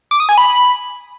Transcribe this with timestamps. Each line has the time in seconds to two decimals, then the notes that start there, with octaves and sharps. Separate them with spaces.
0.11 D6
0.20 D#6
0.29 G#5
0.38 B5